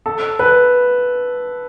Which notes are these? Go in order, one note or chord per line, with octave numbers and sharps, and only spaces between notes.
A4
B4